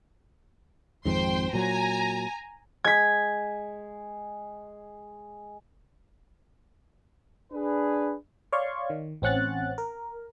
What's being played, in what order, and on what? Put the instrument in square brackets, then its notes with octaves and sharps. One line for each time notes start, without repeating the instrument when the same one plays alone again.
[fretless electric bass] G#1 F2 G#2 [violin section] C5 G5 C6
[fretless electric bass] A#2 F#3 [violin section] G#5 A#5
[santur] G#3 [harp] G#6 B6
[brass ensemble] D4 G#4 B4
[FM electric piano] C#5 D5 F5 C6 C#6
D#3
A1 C4 C#4 F#5 F#6 A6
A#4